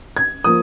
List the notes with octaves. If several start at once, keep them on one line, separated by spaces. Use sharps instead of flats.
G#6
F3 A#3 D#6